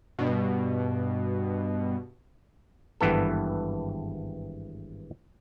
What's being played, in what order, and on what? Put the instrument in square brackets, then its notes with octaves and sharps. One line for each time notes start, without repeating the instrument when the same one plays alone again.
[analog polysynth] G2 B2
[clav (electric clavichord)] G#1 G2 E3 B3 A4